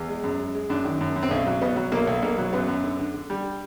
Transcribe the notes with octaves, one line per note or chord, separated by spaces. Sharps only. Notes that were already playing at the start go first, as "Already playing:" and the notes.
Already playing: E2
G#3
F#2
G#3
G#3
F#2 D4
D#3
F#2
F#2
C4
B1 C#4
F#3
B2 B3
F#3
B1 A#3
B1
B1 A#3
F#3
F#2 B3
F#2
D3
D3
D3
G3